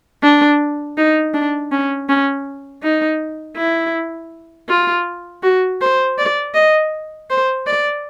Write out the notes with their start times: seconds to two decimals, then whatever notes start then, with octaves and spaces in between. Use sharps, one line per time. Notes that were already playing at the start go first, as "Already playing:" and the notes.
0.23 D4
0.97 D#4
1.34 D4
1.72 C#4
2.09 C#4
2.83 D#4
3.57 E4
4.69 F4
5.43 F#4
5.81 C5
6.19 D5
6.55 D#5
7.30 C5
7.67 D5